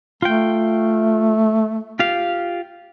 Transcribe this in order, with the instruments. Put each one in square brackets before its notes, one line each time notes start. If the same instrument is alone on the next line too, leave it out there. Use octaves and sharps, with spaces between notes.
[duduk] A3 [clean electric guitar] F4 G5
[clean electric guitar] F4 G4 F5